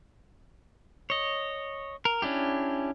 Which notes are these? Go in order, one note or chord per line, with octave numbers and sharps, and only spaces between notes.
C#5 D#5
A#4
C#4 D4 E4 G4